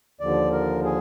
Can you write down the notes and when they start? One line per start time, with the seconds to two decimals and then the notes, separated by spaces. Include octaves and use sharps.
0.20 D#2 D3 F3 D5
0.52 A#4
0.84 G#4